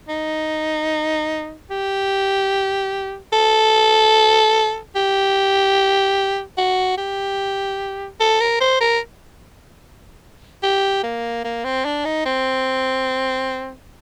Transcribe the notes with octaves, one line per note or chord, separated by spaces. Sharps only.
D#4
G4
A4
G4
F#4
G4
A4
A#4
C5
A#4
G4
A#3
A#3
C4
D4
D#4
C4